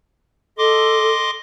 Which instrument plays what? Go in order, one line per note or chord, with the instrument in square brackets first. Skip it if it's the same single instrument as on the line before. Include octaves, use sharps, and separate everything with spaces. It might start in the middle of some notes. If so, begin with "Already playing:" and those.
[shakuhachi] A4 [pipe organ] D#5 C6 D6